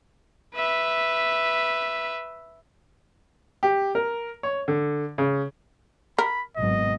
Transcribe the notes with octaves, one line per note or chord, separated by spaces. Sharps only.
B4 E5
G4
A#4
C#5
D3
C#3
A#4 B5
G#1 B2 F#3 D#5